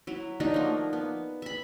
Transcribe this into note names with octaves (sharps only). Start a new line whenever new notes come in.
F#3 E4
F#3 A3 D4 D#4
F3 A#3
B3
E5 B5